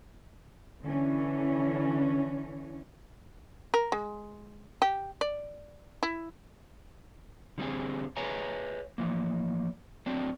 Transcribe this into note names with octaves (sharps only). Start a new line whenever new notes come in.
D3 E3 C#4
A#4
G#3
G4
D5
E4
D3 G3 C4 G#4
G#4 B4 C#5 E5 G#5 A#5
E3 F3 A#3
F#3 A3 C4 D4